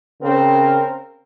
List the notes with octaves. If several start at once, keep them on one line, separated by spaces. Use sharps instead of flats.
C#3 C4 A#4